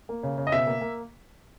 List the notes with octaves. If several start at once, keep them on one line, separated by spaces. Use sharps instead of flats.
A#3
C#3
C#3
D#5
B2 E5
A#3
A#3